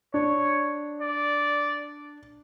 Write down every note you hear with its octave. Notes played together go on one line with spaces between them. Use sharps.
D4 C#5
D5